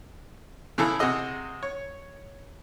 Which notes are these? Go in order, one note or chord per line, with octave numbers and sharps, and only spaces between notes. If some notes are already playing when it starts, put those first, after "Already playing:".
C#3 E3 E4 G#4 A4
C3 F#4 G#4 D#5 E6
C#5